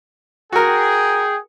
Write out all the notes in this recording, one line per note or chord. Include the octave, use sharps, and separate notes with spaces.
F#4 G#4 A#4 G5